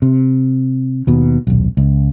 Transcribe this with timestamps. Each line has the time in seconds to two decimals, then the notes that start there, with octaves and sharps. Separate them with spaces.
0.02 C3
1.07 D#2 B2
1.47 D#1 B1
1.77 C#2